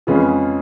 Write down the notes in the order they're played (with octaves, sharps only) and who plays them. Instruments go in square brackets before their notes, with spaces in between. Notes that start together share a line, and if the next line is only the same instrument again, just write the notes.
[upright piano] F2 C#3 G#3 C#4 F4 G#4 B4